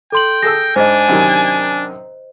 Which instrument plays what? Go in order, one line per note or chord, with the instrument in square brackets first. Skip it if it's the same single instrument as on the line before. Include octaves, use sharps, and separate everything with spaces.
[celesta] A4 C6 F#7 [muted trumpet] G5
[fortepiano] G#4 A4 E6 [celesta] A#6
[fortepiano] G#2 [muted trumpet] D4 [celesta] C5 D#5 [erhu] G#5
[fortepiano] F#2 C3 D#3